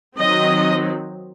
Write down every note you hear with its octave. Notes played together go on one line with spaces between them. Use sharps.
D#3 F#3 C4 D#5